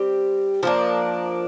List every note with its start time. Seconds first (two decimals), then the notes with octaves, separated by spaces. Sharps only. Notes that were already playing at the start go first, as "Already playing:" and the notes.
Already playing: G3 C4 G4
0.63 F3 A#3 D4